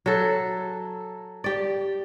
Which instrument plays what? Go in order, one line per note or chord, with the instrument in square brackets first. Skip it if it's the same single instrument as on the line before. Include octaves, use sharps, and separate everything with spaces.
[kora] F#3 A4
G4 D5